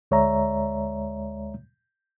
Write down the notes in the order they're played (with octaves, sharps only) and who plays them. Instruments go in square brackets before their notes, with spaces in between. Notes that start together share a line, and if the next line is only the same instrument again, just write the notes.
[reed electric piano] D2 G#3 C#5 D5 E5 A#5